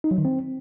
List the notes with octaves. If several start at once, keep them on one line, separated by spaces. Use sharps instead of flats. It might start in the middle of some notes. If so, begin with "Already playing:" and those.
D#4
F#3
D#3
C4